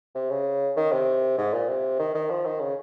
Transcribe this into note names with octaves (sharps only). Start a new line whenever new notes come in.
C3
C#3
D#3
C3
G#2
A#2
C3
D#3
D#3
F3
D#3
C#3